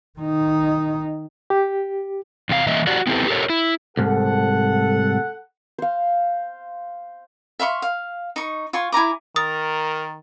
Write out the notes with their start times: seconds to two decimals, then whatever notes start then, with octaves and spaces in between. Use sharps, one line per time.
0.19 D#3 D#4
1.50 G4
2.49 E2 C3 F4 F5
2.67 E3 A#3 D#5 E5
2.87 F#4 G4 D5 F#5
3.07 B3 C4 E4 G4 A4 B4
3.28 G4 A4 A#4 C#5
3.50 E4
3.97 C2 G#2 A4 F#5
5.78 C5 F5
7.59 E5 F5 C6 C#6
7.82 F5
8.36 D#4 C#6
8.73 F4 G#5 C#6
8.92 E4 G#5 A#5 D6
9.36 D#3 A#4 D#6 A6